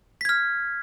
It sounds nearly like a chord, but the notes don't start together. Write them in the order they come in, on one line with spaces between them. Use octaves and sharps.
B6 G#6 F6